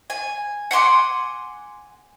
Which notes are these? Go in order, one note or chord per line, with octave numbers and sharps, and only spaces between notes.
G#5
F#5 G#5 C6 D6